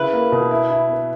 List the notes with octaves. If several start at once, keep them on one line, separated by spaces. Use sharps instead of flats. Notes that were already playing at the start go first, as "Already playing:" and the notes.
Already playing: C#3 E4 B4
A#3
B2
E4
E4
B3